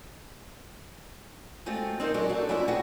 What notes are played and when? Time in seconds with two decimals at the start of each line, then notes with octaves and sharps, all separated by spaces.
1.66 G#3 A3 C4 F4 F#4
2.00 C4 D#4 A#4 C5
2.14 E2 F#3 D4 F#4 G#4 A#4
2.29 A3 D4 F#4
2.49 F2 F3 C#4 D4 E4 E5
2.68 C4 F#4 G#4 B4 F#5